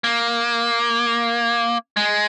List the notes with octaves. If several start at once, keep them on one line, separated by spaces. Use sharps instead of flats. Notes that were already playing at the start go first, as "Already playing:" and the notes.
A#3
G#3